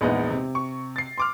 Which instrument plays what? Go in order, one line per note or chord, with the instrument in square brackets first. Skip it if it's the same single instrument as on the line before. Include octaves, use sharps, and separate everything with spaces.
[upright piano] A#1 E2 [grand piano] G#3 B3 D#4
[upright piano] C3
[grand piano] C#6
A6 C7
C6 D6 F6